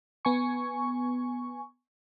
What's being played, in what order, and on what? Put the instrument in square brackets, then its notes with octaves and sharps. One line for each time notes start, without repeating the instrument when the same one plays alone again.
[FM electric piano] B3 G#5 C#6